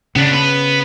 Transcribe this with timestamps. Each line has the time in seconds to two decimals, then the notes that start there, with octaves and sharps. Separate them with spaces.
0.16 C#3 B3 D4
0.33 B3 B4